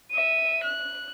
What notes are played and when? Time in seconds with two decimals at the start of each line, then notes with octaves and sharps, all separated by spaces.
0.11 E5 D#7
0.64 F#6